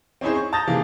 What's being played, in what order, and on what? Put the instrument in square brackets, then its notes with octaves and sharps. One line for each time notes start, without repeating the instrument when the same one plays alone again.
[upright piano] C4 C#4 D#4 E4 G#4 C5
C#6
A5 A#5 D#6 G6 A6 A#6
C3 D#3 E3 A#3 G#4